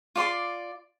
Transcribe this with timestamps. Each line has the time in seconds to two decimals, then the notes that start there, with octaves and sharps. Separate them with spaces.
0.16 F4 D5 C6 D6